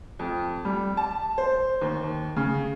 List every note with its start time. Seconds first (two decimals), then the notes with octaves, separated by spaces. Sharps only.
0.19 F2
0.65 G3
0.97 A5
1.38 C5
1.81 D#2
2.36 C#3